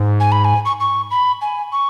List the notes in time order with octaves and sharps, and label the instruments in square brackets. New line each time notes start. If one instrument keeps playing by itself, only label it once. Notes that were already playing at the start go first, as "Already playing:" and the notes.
Already playing: [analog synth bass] G#2
[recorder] G#5
B5
G#5
C#6
C#6
B5
G#5
C#6